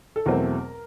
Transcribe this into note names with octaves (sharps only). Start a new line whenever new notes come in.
A4
E2 B2 F#3 A3 C4 A#4